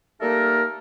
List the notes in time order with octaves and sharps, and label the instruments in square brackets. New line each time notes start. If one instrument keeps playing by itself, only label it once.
[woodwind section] G3 A3 A#3 D#4 A4 A#4